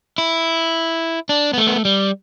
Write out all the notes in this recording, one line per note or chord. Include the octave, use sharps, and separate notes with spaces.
E4
D4
B3
A3
B3
A3
G3